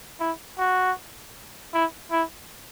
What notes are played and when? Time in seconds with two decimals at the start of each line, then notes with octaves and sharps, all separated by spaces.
0.20 E4
0.58 F#4
1.73 E4
2.11 E4